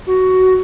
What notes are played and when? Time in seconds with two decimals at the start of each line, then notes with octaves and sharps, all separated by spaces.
0.06 F#4